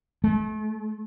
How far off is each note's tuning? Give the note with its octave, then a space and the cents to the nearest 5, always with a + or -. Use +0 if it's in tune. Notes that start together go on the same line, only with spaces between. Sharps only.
A3 -35